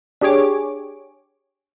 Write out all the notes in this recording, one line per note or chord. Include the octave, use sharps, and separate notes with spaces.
D4 G4 G#4 C#5 D6